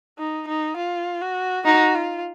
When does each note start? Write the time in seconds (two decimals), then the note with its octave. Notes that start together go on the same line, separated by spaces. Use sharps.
0.18 D#4
0.48 D#4
0.77 F4
1.21 F#4
1.65 D#4 F#4
1.95 F4